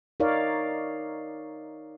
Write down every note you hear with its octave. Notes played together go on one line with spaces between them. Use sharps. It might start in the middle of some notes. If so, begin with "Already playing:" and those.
D#4 A#4 C#5 D5 F5